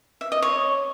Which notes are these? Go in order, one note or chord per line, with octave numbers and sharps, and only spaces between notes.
E5
D#5
C#5